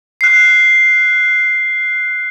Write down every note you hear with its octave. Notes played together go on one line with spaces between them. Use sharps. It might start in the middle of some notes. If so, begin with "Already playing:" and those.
F#6 C7